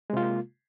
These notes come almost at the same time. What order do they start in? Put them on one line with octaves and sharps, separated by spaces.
G#3 C3 F4 A#3